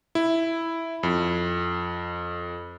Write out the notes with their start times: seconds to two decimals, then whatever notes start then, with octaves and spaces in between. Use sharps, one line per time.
0.15 E4
1.03 F2